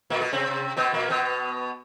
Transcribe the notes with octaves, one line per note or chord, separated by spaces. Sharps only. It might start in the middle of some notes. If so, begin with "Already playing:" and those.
A#2 A#3
B2 B3
C3 C4
B2 B3
A#2 A#3
B2 B3